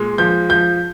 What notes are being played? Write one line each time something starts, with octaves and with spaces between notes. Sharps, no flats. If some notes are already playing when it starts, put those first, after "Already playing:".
Already playing: A#2 G#3
F3 G6
F3 G6